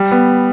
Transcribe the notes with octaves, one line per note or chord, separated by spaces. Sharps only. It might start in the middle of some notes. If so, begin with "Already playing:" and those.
Already playing: G3
B3